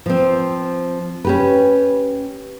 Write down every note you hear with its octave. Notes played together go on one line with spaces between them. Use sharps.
F3 C4
C#4 G4 B4